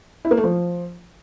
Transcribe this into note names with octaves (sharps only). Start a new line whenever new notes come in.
E4
A#3
A3
F3